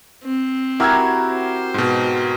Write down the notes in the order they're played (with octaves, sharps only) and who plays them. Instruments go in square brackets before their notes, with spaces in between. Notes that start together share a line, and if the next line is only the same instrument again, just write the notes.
[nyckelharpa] C4
[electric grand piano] E4 E6 G#6 [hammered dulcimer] F#4 G4 A#4
[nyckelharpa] C5
[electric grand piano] G#2 B2